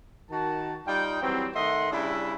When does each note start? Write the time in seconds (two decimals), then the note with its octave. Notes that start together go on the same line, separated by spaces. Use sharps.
0.30 D#3 F#4 A5
0.86 G3 D#4 F4 G5
1.22 E3 F#3 G3 C4
1.55 D#3 A3 D#5 E5 F#5 C6
1.92 C#3 G3 D4 E4